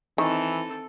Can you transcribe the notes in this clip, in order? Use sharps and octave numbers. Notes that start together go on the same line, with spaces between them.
D#3 E3 C4 A4